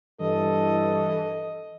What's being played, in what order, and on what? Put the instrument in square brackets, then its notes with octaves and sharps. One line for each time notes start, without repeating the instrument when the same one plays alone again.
[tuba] G2 [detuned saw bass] E3 [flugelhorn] A4 [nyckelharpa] D#5